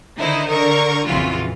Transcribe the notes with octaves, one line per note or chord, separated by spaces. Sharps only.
D3 D#3 D#4 E4 C5
D3 A#4 C#6
A#1 F2 C#3 E3 F4 F#4